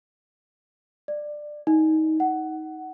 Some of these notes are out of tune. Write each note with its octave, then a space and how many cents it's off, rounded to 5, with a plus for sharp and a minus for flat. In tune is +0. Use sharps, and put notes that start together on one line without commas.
D5 +15
D#4 +20
F#5 +15